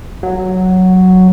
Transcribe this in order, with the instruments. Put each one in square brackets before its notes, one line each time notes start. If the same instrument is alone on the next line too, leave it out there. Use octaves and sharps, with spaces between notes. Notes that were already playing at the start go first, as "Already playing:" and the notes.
[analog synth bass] F#3